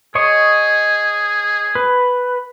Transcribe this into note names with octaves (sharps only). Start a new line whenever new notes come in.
G#4 C#5 D#5 C#6
B4